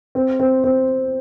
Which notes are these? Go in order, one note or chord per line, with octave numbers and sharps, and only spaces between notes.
C4
C4
C4